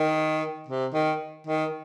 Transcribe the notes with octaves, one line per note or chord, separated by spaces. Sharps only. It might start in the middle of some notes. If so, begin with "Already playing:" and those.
Already playing: D#3
C3
D#3
D#3